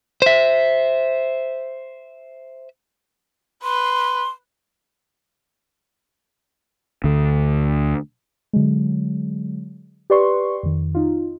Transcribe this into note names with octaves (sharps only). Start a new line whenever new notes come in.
C5 E5
B4 C6
D2 D3
D3 F#3 G#3
G4 B4 D5 C6 C#6
F2 D#3
D#4 F4